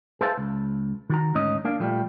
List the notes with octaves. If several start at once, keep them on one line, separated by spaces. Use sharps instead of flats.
G#4 B4 C5 E5 F5 A5
C#2
D#3 F#4 A#5
D2 G#2 C#4 D#4 D#5
A#3 D4 F5
A#2 F3 G3 A3